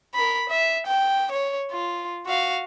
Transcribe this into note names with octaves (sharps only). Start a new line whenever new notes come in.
A#4 B5
E5
G5
C#5
F4
F#4 F5